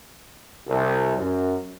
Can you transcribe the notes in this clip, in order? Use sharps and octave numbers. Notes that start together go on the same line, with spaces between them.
C2
F#2